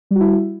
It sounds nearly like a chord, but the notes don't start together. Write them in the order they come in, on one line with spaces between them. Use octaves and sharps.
G3 F#4 E4